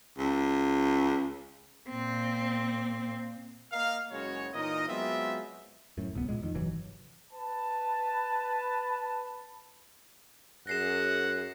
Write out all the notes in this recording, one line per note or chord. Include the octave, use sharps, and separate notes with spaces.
C#2
A#2 C4
A#3 A#4 D#5 F5
F#1 C#3 G#3 F#4 C#5
A#2 E3 D#4 A#4 D#5
F#3 G#3 B3 C4 F4 E5
F#2 A2
D1 C2 B3
A#2 G#3
F2 D#3
G1 C3 E3 F#3
B4 A5
F#2 G#4 F#5 A#6 C7 E7